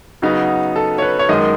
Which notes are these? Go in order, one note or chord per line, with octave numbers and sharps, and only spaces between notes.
C#3 F#3 B3 D#4
A4
C#5
B4
C#5
F#2 D#3 G#3 D#4 D#5